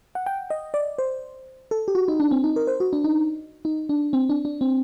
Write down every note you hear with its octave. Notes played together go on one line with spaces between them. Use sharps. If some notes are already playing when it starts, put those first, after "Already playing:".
F#5
G5
D#5
D5
C5
A4
G4
F#4
D#4
D4
C4
D#4
A#4
C5
F#4
D4
D#4
D#4
D4
C4
D4
D4
C4